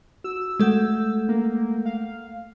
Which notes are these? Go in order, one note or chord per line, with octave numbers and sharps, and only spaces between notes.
F#4 E6
G#3 A3 A4 F#5 G6
A#3
F5